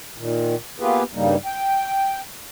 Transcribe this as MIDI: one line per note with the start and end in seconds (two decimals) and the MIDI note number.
0.18 0.55 46
0.18 0.55 51
0.80 1.03 58
0.80 1.03 59
0.80 1.03 65
0.80 1.03 67
0.80 1.03 68
0.80 1.03 71
1.14 1.36 43
1.14 1.36 49
1.14 1.36 55
1.14 1.36 58
1.14 1.36 63
1.45 2.20 79